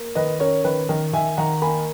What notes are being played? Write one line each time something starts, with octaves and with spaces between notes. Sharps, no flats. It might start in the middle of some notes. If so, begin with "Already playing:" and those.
Already playing: A#3
D#3 B4 D#5
C#4 A#4 C#5
D#3 B4
D#3 A#4
D#3 E5 G#5
D#3 F#5 A#5
A#3 G#5 B5